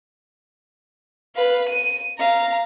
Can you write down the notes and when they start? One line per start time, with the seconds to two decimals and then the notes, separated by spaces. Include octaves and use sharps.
1.35 B4 F5
1.69 D#7
2.19 F5 A#5